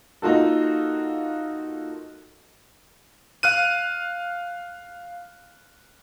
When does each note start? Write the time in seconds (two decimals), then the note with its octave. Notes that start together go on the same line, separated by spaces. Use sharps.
0.22 A#3 D#4 F4 F#4 A4
3.43 F5 F6 F#6 D#7